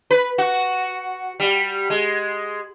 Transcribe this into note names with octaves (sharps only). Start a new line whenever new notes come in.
B4
F#4
G3
G#3